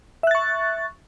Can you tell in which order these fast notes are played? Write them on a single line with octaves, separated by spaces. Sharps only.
E5 F#6 A6 C#6